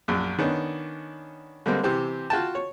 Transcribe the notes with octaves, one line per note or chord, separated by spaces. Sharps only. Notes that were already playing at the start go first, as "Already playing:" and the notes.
A#1 F#2
D#3 B3 C#4 D4
D3 G3 G#3 A#3 C4
C3 E3 G4 C5
F4 F#4 G5 A5
C#5